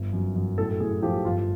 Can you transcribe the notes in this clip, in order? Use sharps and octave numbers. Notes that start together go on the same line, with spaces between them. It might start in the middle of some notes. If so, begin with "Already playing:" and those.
Already playing: G1
F#2
F#2
A2 A4
A2 G#4
F3 G4
G1 F4